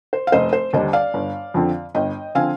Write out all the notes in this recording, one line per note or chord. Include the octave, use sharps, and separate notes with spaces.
C5
F5
F1 C5 D#5
C5
D#2 D3 G3 D4 C5 D#5
D5 F5
G1
F2 D3 F3 C4
G1 D#5 G5
D3 F3 C4 F5 G#5